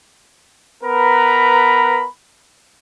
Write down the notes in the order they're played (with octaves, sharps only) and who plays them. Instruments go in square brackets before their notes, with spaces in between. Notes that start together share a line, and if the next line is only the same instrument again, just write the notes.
[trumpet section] B3 A#4 B4 A#5 B5